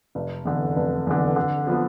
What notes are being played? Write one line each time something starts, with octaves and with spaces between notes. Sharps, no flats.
F1
E2 D3
F1
E2 D3
D3
F3 B3